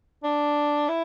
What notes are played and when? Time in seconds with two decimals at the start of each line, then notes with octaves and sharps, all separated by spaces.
0.24 D4
0.89 E4